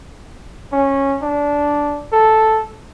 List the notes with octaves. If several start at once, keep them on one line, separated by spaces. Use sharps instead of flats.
C#4
D4
A4